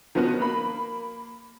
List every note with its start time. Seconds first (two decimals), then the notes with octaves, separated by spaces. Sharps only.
0.15 D#3 F3 B3 C#4 F#4
0.40 A#3 B5